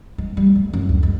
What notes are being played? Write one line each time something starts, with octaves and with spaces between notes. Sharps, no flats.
G#3
G3
A3
F#2
D2
G#3